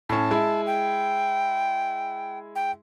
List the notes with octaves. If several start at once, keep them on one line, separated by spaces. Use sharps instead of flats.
A2 C#4 A5
G#3 E4
G5
G5